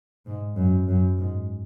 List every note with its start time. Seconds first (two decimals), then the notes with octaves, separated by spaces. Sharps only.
0.26 G#2
0.56 F#2
0.88 F#2
1.18 G#2